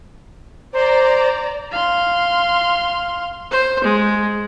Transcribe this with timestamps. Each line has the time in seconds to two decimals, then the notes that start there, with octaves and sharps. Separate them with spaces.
0.73 C5 D5 A#5
1.72 F5 C6
3.51 C5
3.84 G#3